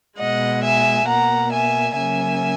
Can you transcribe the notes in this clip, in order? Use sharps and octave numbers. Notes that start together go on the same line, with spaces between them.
B2 G#3 D#5 F#5
E5 G#5
B2 A#3 F#5 A#5
E5 G#5
C#3 F#3 A#3 E5 G#5